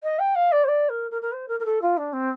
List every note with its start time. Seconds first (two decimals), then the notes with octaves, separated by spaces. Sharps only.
0.03 D#5
0.19 G5
0.35 F5
0.52 D5
0.64 C5
0.68 D5
0.89 A#4
1.11 A#4
1.21 A#4
1.32 C5
1.48 A#4
1.59 A#4
1.65 A4
1.81 F4
1.97 D4
2.13 C4